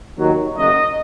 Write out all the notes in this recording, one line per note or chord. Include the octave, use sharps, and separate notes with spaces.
D#2 D#3 F#3
F#1 F#2 C#3 F#3 D#5